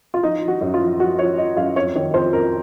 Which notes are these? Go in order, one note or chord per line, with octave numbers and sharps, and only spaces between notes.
F4
F3 D#4
F3
F#4
F#2
F4
F3
F3 F#4
F3 C#5
F3 D#5
F#2 F5
F2 C#5
D#3 C#5
F2 C5
F2 A#4